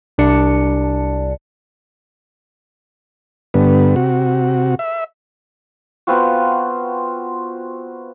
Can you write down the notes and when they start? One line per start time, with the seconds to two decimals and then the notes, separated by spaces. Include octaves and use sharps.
0.18 C2 D4 C#7
3.54 G2 D3 B3
3.96 C3 F#4
4.79 E5
6.07 B3 C4 F4 F#4